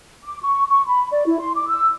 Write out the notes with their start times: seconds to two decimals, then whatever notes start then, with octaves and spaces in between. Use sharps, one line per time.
0.23 D6
0.41 C#6
0.70 C#6
0.87 B5
1.12 D5
1.26 E4
1.39 C6
1.55 D6
1.69 E6